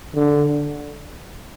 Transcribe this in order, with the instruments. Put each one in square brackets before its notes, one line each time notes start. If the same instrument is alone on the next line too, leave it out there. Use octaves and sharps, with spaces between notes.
[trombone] D3